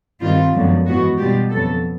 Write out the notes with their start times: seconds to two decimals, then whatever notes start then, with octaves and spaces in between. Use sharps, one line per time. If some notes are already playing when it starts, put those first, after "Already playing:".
0.21 G2 D#3 G3 C4 F4
0.54 F#2 D3 F3 G#3 B3
0.86 G#2 E3 G#3 B3 F#4
1.18 B2 G3 B3 D4 F4 G4
1.51 F2 C#3 F#3 B3 A4